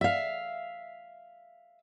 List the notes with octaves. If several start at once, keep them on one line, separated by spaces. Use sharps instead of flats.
E5 F5